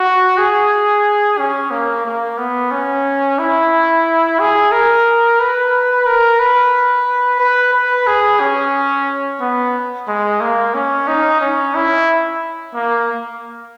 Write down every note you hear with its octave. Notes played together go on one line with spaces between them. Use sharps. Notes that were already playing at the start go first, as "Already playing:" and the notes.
Already playing: F#4
G#4
C#4
A#3
A#3
B3
C#4
E4
G#4
A#4
B4
A#4
B4
B4
B4
G#4
C#4
B3
G#3
A#3
C#4
D#4
C#4
E4
A#3